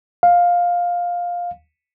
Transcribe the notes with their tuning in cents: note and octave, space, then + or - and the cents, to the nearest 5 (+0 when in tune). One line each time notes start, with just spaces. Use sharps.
F5 +10